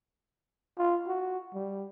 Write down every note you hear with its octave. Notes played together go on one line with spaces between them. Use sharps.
F4
F#4
G3